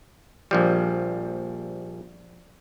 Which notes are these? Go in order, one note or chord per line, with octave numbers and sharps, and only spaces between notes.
A#1 F3 G3